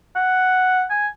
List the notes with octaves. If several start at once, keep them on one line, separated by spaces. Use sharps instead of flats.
F#5
G#5